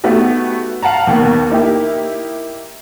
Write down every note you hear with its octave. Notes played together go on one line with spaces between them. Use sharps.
A3 B3 D#4 F#4 G4
F5 F#5 A5 A#5
D#2 D#3 A#3 B3
A#3 D#4 E4 G4